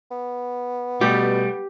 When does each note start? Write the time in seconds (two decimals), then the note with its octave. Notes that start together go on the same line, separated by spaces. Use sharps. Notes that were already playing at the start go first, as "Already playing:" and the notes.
0.11 B3
1.01 B2 G3 A3 G4